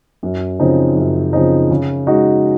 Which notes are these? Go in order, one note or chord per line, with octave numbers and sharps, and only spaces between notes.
F#2
C#3 F3 C4 D#4
F#2
C#3 F3 C4 D#4
C#3
G#3 D#4 F#4